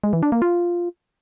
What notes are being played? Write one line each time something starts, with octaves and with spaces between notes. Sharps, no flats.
G#3
E3
D4
A#3
F4